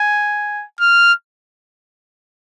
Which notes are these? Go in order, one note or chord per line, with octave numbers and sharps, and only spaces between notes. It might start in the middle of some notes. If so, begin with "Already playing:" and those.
Already playing: G#5
F6